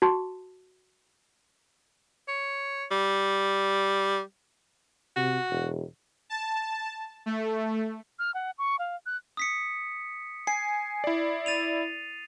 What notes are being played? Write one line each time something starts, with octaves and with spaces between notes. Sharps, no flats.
F#4 A5 C6
C#5
G3
C3 F#4
E1
A5
A3
F6
F#5
C#6
F5
F#6
D#6 B6 C#7
G#5 C7
E4 D5
A6 D#7 F7